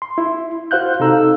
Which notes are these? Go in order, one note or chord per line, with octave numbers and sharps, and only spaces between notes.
C6
E4
F#4 C5 F5 F#6 G6
C3 D#4 A4 F5 A#5 E6